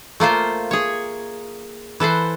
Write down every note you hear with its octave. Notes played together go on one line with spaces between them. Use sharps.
A3 A#3 F4 C5
G#4 C#5
E3 A4 B4 C5